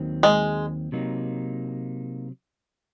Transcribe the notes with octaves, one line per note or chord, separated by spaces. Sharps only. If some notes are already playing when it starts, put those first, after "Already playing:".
Already playing: D#2 D#3 F#3 C4
G#3
C3 F#3 A#3 D#4